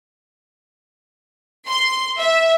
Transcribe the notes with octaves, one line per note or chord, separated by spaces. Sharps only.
C6
E5